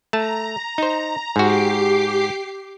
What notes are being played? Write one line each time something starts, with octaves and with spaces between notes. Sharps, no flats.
A3 A5 A#5
D#4 C5
G#2 F#4 G4 D6 C7